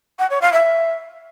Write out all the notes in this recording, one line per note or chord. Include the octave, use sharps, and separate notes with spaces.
F#5
C#5
F5
E5